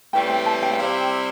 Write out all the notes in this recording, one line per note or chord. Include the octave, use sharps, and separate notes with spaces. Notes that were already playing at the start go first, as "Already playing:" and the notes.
A2 E3 G3 C4 G5
G5
A5
G5
G5
C3 G3 C4 E4 F5
G5